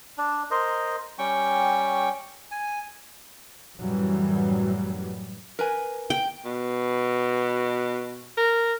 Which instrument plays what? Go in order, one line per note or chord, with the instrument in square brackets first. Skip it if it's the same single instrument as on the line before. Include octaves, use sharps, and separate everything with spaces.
[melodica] D4
A#4 C5 D#5
G3 C#4 G5 C#6
G#5
[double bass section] F#2 A2 E3 F#3 G3
[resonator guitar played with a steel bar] A#4 B4 G#5
[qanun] G5
[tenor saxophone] B2
A#4